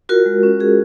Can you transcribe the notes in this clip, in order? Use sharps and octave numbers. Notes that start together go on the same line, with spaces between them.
F4 F#4 A#4
G#3
C#4
F4 G#4